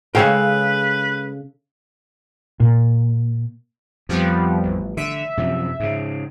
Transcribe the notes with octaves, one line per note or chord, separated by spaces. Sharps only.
C#3 G#3 A4 B4 C#5 F5 G5
A#2
F2 F3 G3 B3
A1
D3 E5
F#2 C3 F3
G#2 C#3